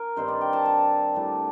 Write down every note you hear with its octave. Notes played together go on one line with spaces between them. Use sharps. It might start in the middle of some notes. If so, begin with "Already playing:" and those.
Already playing: A#4
G2 D#3 G3 C4 C5
D5
G5
A5
A5
A2 G3 D4